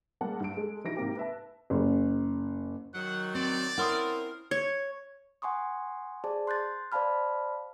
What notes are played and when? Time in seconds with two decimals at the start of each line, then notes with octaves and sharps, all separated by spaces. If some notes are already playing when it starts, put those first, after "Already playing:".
0.21 G3 G#3 A#3 G#4 F#5 A5
0.40 G2 D7
0.57 G#3 A4
0.85 A#1 D#4 E4 F#4 A#6 D7
0.97 G#2 C3 A#3 G4
1.17 B4 E5 A5
1.70 F#1
2.94 D#3 F#3 F#5
3.35 C4 D5
3.78 C4 C#4 E4 A#4 F#5 C6 D#6
4.51 C#5
5.42 F#5 G#5 C6 C#6 D#6
6.24 G#4 C5 D5 A5
6.47 C6 F#6 G6 A6
6.92 C5 D5 F5 A5 B5 F6